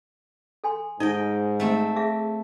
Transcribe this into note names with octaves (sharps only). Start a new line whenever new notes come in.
A4 G#5 C6
G#2 D#4 D#5 G5
A3 C4
G#4 E5 F5